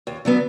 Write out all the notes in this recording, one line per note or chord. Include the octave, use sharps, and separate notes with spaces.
D#2
D3 F#3 B3